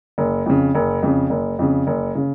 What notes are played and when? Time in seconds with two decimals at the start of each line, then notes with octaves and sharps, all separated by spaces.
0.18 F#1
0.46 F2 C#3
0.75 F#1
1.03 F2 C#3
1.30 F#1
1.59 F2 C#3
1.87 F#1
2.15 C#3